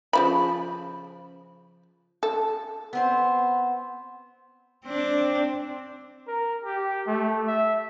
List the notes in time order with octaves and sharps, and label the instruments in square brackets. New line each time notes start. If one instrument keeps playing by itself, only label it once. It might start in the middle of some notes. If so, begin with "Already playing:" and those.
[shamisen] C#3 F3 B5
A4
[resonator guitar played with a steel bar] B3 C4 C5
[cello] C4 D4
[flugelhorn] A#4
G4
A3
E5